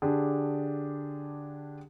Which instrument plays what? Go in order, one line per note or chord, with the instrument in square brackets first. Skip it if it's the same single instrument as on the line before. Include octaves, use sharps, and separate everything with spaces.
[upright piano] D3 D4 G4 G#4